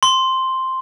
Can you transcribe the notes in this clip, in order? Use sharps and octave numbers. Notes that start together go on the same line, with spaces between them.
C6